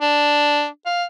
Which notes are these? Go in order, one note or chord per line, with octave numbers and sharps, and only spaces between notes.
D4
F5